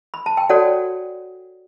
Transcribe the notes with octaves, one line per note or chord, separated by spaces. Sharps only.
B5
A5
G5
F#4 A4 C#5 D5 F#5